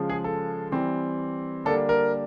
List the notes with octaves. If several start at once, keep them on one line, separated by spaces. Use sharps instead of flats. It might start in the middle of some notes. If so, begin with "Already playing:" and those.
Already playing: C#3 F3 G#3
G#4
A4
E3 G3 C4
D3 G3 A#3 D4 A4
A#4